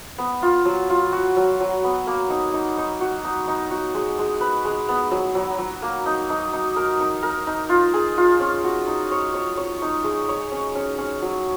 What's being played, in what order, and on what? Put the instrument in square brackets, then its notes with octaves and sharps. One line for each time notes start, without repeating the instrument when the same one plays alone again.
[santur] B3
F4
F#3
F4
F#4
F#3
F#3
B3
A#3
D#4
D#4
D#4
F#4
D#4
D#4
F#4
G#3
G#3
B4
G#3
B3
F#3
F#3
F#3
A#3
D#4
D#4
D#4
A#4
D#4
A#4
D#4
F4
G#4
F4
C#4
F#4
D#4
C#5
C#5
C#5
D#4
G#3
C#5
C#4
C#4
C#4
F#3